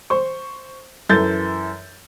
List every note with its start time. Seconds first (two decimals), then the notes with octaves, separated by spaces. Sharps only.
0.10 C5 C#6
1.09 F#2 E3 A4 G6 A6